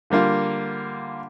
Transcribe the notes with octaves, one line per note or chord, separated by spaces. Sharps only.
D3 G3 A#3 F4